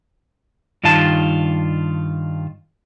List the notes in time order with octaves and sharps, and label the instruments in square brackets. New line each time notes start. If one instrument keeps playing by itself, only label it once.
[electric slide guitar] G2 D#3 F4 A5